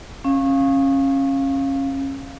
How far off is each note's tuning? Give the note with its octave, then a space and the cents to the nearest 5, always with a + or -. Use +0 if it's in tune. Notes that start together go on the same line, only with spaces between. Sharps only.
C#4 -25 F5 +0